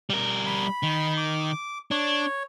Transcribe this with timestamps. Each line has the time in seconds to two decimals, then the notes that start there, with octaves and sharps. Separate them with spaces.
0.10 G3 A#4
0.46 B5
0.83 D#3
1.18 D6
1.91 D4 C#5